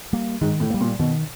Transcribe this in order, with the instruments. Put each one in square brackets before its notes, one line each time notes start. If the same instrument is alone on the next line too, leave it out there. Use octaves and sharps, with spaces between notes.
[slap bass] G3 A#3
[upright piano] G#2 [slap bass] D#3
[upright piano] A2
[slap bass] G3 A#3
[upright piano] A#2
[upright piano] B2 [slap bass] D#3